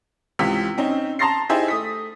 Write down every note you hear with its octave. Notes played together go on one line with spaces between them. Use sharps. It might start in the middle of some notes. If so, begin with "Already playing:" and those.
C#2 C3 E3 E6 B6
C4 C#4 D#4
A5 A#5 C6 A6 A#6 C7
D#4 E4 G4 G#4 C5 E5
A3 D#6 B6